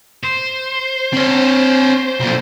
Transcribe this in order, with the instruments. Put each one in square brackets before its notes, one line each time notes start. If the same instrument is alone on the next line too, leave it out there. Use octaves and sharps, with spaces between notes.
[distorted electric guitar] C5
[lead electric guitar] C4 C#5
B1 A#2